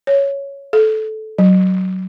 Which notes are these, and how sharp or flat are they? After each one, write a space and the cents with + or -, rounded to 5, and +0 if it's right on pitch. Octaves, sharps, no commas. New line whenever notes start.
C#5 +5
A4 -15
F#3 +15